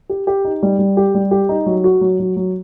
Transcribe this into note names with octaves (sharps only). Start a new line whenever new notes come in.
G4
G4
D#4
G3
G3
G4
G3
G4
D#4
F#3
F#4
F#3
F#3
F#3